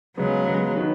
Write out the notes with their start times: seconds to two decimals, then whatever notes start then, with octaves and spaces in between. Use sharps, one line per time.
0.17 C#3 F#3 G#3 B3
0.46 C#3 G#3 B3
0.75 D#3 F#3 D#4 B4